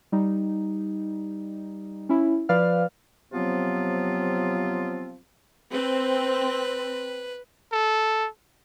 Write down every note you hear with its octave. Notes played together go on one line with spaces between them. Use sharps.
G3 D#4
C#4 E4
F3 B4 D5 F5 F6
C3 F3 F#3 B3 C4 F4
C4 B4
A4